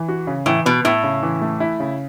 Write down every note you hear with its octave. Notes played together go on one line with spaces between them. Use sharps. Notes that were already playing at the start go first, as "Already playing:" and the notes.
Already playing: E3
F#4
C#3
A2 E3
B2 B3
A2 E4
C#3
E3
A3
E4
C#3